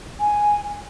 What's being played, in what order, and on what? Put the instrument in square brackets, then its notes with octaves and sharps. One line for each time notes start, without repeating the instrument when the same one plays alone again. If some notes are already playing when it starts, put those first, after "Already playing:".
[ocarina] G#5